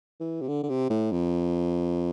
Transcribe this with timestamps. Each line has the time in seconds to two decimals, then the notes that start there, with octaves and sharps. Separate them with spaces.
0.20 E3
0.41 C3
0.48 D3
0.63 D3
0.69 C3
0.90 A2
1.12 F2